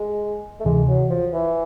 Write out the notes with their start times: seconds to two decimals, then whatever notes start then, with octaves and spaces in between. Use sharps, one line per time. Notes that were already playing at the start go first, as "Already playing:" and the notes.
Already playing: G#3
0.60 A3
0.65 D2 C3 E3 G#3
0.88 F#3
1.10 F3
1.33 E3